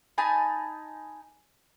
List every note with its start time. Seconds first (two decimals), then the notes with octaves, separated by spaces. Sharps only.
0.18 D#4 G#5 A5 B5